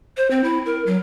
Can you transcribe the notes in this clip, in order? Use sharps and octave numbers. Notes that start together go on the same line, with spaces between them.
C5
C4
E4
A#4
F#3